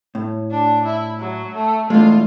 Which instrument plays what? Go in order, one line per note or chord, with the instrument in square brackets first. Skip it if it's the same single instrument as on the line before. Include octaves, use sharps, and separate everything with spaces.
[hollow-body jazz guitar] A2
[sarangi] D4
E4
F#3
A3
[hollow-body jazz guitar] E2 G#3 [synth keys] A3 [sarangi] F4